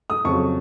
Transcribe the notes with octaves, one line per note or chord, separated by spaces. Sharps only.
D#6
F2 C#3 F#3 C#6